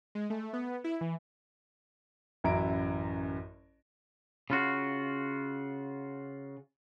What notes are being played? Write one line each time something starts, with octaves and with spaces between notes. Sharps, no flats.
G#3
A3
B3
E4
E3
A1 F#2 E4 A#5 D7
C#3 F4 F#4